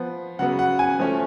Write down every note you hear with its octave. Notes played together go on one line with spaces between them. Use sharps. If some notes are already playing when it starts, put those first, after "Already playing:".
Already playing: F3 B3
C#3 F#3 B3 F#5
F#5
G#5
F3 A3 C#4